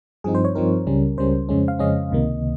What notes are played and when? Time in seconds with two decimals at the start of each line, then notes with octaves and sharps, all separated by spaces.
0.24 G2 F3 C4 D#4 G#4
0.35 C5
0.45 C#5
0.55 G2 F3 C4 D#4 A#4
0.86 C#2 C#3 G3 C#4
1.18 C#2 C#3 G3 C#4 C5
1.49 F2 C#3 G#3 C#4
1.68 F5
1.79 F2 C#3 G#3 C#4 D#5
2.11 C#2 C3 D#3 A#3